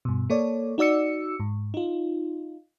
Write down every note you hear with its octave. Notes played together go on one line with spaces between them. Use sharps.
G2 B2
A#3 A4 C#5 D5
D#4 F#4 D5 E6 C#7
G#2
D#4 F4